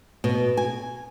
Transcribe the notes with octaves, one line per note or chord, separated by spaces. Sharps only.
B2
G#5